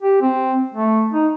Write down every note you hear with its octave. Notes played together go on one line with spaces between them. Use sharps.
G4
C4
A3
D#4